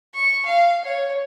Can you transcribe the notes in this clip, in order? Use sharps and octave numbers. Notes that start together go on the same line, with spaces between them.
C#6
F5
C#5